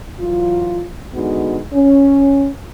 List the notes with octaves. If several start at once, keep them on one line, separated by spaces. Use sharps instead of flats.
E3 F#3 F4
D3 G#3 B3 D#4 F#4
C#4